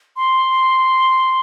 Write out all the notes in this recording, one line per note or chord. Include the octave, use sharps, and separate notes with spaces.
C6